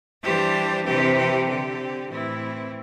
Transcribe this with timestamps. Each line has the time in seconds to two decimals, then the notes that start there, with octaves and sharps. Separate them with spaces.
0.23 E3 G3 D4 G4 C5
0.86 C3 E3 C4 G4
1.18 G4
1.48 D3 C4 G4
2.11 A2 E3 C4 E4